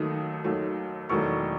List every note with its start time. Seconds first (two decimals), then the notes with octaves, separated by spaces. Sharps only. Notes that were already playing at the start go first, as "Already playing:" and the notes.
Already playing: D#2 D#3 F#3 A3 D#6
0.44 D#2 D#3 F#3 A3
1.09 E1 E2 D#3 F#3 A3 C#6